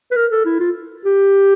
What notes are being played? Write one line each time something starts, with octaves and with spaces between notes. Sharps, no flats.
B4
A#4
A4
E4
F4
G4